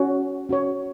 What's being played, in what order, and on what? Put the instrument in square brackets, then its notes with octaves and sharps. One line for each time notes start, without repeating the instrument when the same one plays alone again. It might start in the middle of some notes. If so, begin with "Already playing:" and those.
Already playing: [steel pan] C#4 F#4 C#5
C#4 F#4 C#5